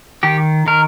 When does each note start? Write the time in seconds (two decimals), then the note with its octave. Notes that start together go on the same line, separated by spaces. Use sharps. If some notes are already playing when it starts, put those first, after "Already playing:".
0.23 D#3 G4
0.66 D#3 A#4